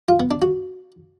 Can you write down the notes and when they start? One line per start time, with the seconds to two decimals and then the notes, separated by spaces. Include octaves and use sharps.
0.09 F4
0.20 B3
0.31 D4
0.42 F#4